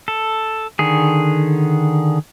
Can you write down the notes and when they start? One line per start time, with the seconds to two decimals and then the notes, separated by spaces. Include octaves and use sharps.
0.08 A4
0.79 D3 D#3 G#4